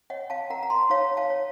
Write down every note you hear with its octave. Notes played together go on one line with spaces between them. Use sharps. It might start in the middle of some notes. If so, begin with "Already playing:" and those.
C#5 D#5 F#5
F5 A5
A#4 F#5 A#5
A#5
A5 C6
D#4 C#5 F5
F5 A5
C#5